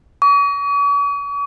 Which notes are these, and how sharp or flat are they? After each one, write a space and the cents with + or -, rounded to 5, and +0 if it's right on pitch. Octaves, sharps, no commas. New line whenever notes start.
C#6 +45